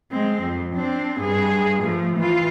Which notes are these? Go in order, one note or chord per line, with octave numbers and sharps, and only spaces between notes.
G#3 C4
F2
C4 D4
G2 G#4
F3 A3
E3 F4